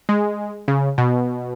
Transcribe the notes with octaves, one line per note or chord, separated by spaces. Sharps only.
G#3
C#3
B2